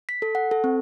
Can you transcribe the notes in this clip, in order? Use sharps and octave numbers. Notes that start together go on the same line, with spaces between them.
B6
A4
F#5
A4
C4